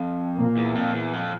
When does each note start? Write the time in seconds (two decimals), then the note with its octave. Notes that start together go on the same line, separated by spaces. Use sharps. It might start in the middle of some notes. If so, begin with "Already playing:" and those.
Already playing: F2
0.38 A#2 A#3
0.57 E2
0.75 F2
0.94 E2
1.13 F2